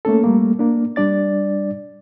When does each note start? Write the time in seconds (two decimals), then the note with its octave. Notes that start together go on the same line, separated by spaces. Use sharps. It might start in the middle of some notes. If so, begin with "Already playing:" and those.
0.05 A3 A#3 C#4 A4
0.24 G3 A3 A#3
0.59 A#3 D4
0.96 G3 D4 D5 A6